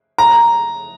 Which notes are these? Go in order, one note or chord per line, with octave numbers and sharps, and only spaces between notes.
A#5